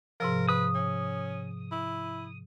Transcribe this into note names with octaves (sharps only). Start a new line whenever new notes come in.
G#2 C3 F3 A#4
B4 D#6
C#4
E4